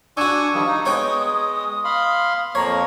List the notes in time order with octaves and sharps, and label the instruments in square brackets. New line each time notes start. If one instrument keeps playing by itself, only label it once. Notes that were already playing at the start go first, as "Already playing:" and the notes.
[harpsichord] D4 F#4 [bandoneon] G#5 C#6 E6
[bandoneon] D#3 F3 G3 [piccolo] D#6
[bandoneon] D#4
[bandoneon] G#3 [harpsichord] B3 C#5 G5
[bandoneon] F5 B5 C6
[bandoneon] F2 F3 A#3 [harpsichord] C#5 [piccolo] A#5